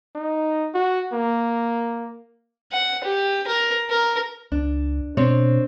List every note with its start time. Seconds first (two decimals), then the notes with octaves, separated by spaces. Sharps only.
0.15 D#4
0.74 F#4
1.13 A#3
2.72 F#5
3.04 G4
3.47 A#4
3.90 A#4
4.52 C#2 D4
5.17 B2 C4 D4 C#5